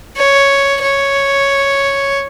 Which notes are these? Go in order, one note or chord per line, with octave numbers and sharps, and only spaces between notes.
C#5
C#5